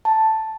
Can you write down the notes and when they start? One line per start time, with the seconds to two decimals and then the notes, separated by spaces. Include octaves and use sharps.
0.05 A5